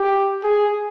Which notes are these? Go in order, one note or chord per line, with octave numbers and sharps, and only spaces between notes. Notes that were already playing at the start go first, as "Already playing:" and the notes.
Already playing: G4
G#4